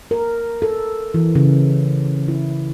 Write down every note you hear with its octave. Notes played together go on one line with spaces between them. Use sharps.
A#4
A4
E3
C#3
E4